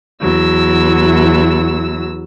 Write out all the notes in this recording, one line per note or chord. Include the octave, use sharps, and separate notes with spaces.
E2 F#3 E6